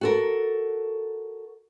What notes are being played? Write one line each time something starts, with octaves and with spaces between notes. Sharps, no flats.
F#4 A4 A#4